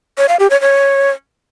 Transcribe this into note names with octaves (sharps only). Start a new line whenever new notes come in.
C#5
F5
G4
C#5
C#5